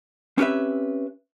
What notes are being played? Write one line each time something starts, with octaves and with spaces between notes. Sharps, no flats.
C4 C#4 G4 B4 E5